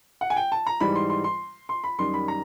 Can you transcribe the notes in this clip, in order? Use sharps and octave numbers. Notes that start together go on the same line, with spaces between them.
F#5
G#5
G5
A5
A#5
G#2 E3 G3 B5
C6
C6
C6
C6
B5
F#2 D#3 G3 C6
B5
A#5